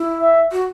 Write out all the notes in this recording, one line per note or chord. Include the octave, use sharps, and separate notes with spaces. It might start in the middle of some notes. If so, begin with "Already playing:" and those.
Already playing: E4
E5
F#4